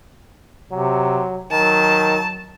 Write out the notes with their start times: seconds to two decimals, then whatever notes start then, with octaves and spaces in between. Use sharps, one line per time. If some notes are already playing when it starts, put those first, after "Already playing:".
0.72 C3 F#3
1.52 D#3 F#3 A5